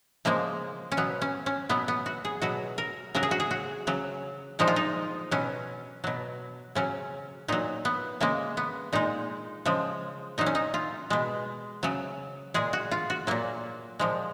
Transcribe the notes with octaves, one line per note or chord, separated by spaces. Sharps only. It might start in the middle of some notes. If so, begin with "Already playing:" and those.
C#3 F3 G#3 A#3
C#4
B2 F#3 B3
C#4
C#4
B2 F#3 B3
B3
F#4
G#4
B2 F#3 F#4
A#4
C#3 F#3 A#4
G#4
F#4
G#4
F#4
C#3 F#3
A#2 F3 G#3 D#4
F4
D#4
B2 F#3 C#4
B2 F#3
C#3 F#3 C#4
A#2 F#3 D#4
B3
C#3 G#3 A#3
B3
A#2 G#3 D#4
C#3 F3 G#3
A#2 F#3 D#4
C#4
D#4
F4
B2 G#3
C#3 F#3
A#2 G#3 G#4
F#4
F4
F#4
A#2 F#3 A#3
A#2 F3 G#3